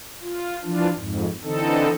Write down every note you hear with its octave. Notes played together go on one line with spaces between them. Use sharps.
F4
E3 F3 D4 F4
F2 G#2
D3 E3 C4 D#4 A4